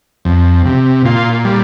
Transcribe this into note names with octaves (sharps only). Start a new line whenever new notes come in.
F2
C3
A#2 F4
G3